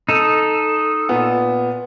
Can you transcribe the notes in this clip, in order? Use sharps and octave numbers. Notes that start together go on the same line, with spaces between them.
D#4 A4
A#2 B3